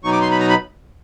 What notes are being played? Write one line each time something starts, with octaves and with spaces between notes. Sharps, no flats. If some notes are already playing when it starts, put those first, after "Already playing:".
B2 F#3 B3 D#4 C#6
D6
C6
B5
A#5
B5